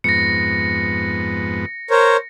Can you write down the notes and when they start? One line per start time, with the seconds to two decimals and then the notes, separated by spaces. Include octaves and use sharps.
0.04 F2 G#2 B3 A#6 C#7
1.90 A#4 C5 C#5